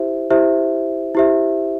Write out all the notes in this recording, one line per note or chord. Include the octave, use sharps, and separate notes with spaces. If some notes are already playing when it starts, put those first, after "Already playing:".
Already playing: E4 G4 C5 E5
E4 G4 C5 E5
E4 G4 C5 E5